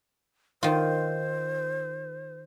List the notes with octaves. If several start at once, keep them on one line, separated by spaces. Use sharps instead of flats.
D#3 F4 C5